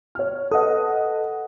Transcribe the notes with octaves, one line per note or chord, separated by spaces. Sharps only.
C#5 F6
A4 B4 D#5 F#5 D#6